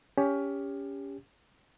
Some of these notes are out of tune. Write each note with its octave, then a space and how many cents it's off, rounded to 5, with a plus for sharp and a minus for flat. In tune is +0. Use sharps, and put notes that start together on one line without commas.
C#4 +20 G4 +25